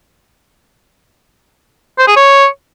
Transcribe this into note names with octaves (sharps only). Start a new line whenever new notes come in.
C5
G#4
C#5